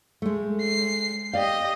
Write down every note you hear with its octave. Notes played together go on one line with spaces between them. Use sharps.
G#3 A3
C7
G4 D5 D#5 F5